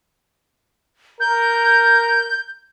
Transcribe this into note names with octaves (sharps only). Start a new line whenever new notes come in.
A#4 G6